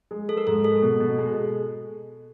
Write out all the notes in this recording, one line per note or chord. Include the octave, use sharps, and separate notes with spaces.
G#3
G#3 A4
A#4
G#2 A4
G#3 A4
B2
B2
G#3